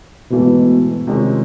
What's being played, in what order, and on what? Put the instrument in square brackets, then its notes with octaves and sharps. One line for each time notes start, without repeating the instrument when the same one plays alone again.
[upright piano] G#2 E3 A3 [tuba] B2
[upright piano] C3 D#3 G#3 C#4 F4